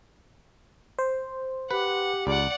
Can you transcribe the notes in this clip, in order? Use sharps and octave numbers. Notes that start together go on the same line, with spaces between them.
C5
G4 B4 F#5
C#2 D5 F#5